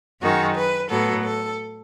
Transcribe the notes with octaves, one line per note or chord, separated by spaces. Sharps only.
F#2 D#3 G#3 F#4
B4
A2 F#3 B3 A4
A4